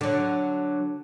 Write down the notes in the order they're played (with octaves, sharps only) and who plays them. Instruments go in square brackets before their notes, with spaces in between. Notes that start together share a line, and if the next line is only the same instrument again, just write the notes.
[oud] D3 F#3